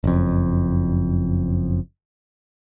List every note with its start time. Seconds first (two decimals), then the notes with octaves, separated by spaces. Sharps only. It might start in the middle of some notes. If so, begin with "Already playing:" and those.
0.04 F#1 F2